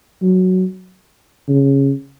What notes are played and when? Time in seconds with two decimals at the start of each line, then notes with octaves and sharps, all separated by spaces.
0.22 F#3
1.48 C#3